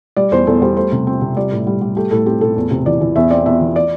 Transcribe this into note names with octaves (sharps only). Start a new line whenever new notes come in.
G3 D5
E2 C5
E2 A4
G3 C5
A3 C5
C3
C4
C3
G3 D5
A2
G3
G3
A3 G4
A2 A4
C4 G4
A2 A4
E2
C3
E3 D5
E3
E2 E5
C4 D5
E2 E5
E3
D5